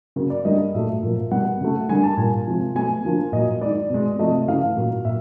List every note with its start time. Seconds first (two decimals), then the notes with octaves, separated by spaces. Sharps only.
0.16 C#3 F#3 A#3
0.30 D5
0.45 D3 G3 A#3 D#5
0.74 A#2 F#3 A3 E5
1.03 A#2 F3 A#3
1.31 B2 G3 A#3 F#5
1.61 C#3 F#3 A3
1.89 D3 G3 A#3 G#5
2.03 A5
2.17 A#2 G3 A#3 G#5
2.47 C3 F3 G#3
2.75 B2 F#3 A3 G#5
3.05 D3 F3 A#3
3.32 A#2 F#3 A#3 D#5
3.61 D#3 G#3 D5
3.90 B2 G#3
4.19 C3 F3 A3 D#5
4.48 C#3 E3 A3 F5
4.77 A#2 F#3 A#3
5.05 A#2 E5